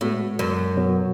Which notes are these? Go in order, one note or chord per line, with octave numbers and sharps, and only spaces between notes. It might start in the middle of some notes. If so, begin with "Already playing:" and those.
A2 G#3 B3 F#4
F#2
B2 F#3 B3 F#4 C#5